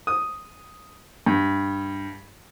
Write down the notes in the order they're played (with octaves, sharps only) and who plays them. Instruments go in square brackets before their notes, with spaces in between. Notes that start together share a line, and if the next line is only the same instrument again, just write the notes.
[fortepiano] D#6
G2